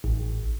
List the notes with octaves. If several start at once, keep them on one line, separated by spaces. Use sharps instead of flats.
A1